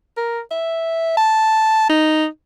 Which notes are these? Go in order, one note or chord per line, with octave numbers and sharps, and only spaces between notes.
A#4
E5
A5
D#4